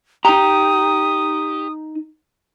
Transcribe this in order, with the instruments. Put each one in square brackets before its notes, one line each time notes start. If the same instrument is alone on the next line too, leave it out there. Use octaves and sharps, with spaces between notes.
[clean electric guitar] D#4 A#5 [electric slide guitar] G4 [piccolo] D#6